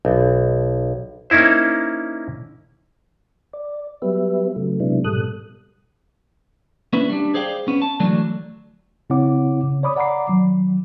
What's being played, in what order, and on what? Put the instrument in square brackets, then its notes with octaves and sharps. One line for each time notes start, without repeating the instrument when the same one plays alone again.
[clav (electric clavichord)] B1
A#3 C#4 D#4 E4 C5
[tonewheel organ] D5
F#3 G3 B3 G4 B4 E5
C#3 F#3 A3
C3 F#3 G#3 B3 D4 E4
G#2 B2 G3 A4 D#6 F#6
[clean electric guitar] A#3 C#4 D4 E4 B4
G3 D4
G#4 C5 D5 F5 G5
B3 C#4
A5
D3 E3 F#3 A3 D4
[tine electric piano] C#3 C4 E4 C#5 F#5 D6
C#3
C#5 D5 B5 D6 D#6
D5 F#5 A#5 B5 D6 C7
D#3 F#3